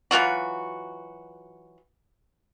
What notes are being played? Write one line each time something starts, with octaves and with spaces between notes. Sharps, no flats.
E3 F#3 F4 F#4